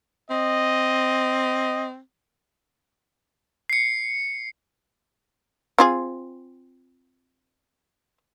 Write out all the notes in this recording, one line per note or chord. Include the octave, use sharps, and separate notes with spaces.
C4 D#5
C7 C#7
C4 F4 G#4